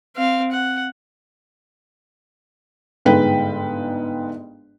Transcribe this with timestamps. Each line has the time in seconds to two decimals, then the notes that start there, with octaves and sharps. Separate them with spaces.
0.16 C4 F5
0.51 F#5
3.05 G1 G#2 G#3 B4 G5